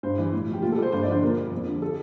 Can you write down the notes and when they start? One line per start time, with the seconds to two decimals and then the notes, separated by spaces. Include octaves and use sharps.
0.03 G2 C5
0.18 E3 G3
0.32 A2
0.48 F3
0.53 G4
0.62 A#2 F4
0.72 A4
0.77 G3 C5
0.92 G2 C5
1.02 D5
1.07 D3 F3 C5
1.23 A#2 A#4
1.37 G3
1.51 F2
1.66 D3 F3
1.82 A4